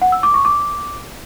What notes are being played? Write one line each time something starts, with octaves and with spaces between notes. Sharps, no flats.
F#5
E6
D6
C#6
D6